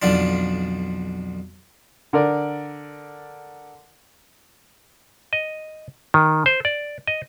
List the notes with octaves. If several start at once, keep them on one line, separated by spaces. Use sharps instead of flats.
B1 F2 D3 D4 F4
D3 A#4 D5
D#5
D#3
C5
D5
D#5